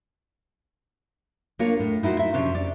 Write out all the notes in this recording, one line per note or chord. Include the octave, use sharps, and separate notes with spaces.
A#3 D4 F4 A#4 C#5
A2
D#4 E4 F#4 G#4 C5
E5
F2 C3 C#4 D4 C5
D5